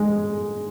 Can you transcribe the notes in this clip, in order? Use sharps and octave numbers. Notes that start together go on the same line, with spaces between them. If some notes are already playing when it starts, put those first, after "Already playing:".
Already playing: G#3